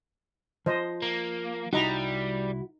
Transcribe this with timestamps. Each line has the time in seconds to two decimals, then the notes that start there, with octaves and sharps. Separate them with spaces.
0.66 F3 C5 D#5
1.02 A#3
1.73 C2 G3 D#4 E4 F#4 D#5 A#5